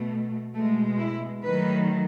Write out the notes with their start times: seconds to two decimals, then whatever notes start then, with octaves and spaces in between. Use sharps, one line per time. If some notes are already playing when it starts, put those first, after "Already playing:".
Already playing: B2 A3
0.54 B2 G#3 A3
0.98 E4
1.43 D#3 F#3 A3 B4